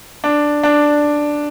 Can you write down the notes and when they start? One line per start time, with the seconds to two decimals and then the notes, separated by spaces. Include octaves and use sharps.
0.24 D4
0.63 D4